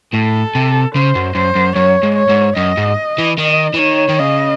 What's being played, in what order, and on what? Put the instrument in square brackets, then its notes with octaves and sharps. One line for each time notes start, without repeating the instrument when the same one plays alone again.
[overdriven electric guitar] A2 [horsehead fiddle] A4
[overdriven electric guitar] C3
[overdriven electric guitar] C#3 [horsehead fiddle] C5
[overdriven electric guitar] F#2
[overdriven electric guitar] F#2 [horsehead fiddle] C5
[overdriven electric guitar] F#2
[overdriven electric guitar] F#2 [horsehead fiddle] C#5
[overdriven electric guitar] G#2
[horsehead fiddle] C#5
[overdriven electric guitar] G#2
[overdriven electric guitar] F#2 [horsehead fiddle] D#5
[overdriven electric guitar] G#2
E3
[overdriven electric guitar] D#3 [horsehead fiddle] D#5
[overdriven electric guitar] E3
[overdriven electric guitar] D#3 [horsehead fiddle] C#5
[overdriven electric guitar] D#3
[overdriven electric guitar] C#3 [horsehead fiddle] D#5